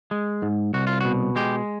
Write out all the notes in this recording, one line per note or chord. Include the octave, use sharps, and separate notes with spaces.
G#3
G#2
C2 F#4
F4
B2 F#4
G#3 G4